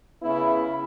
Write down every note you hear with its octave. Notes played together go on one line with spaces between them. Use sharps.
C#3 B3 E4